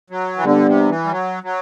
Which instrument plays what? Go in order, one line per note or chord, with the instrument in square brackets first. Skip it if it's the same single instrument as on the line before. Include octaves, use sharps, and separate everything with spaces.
[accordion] F#3
E3
[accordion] D3 [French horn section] G3 B3 D4
[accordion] C3
E3
G3
F#3
F#3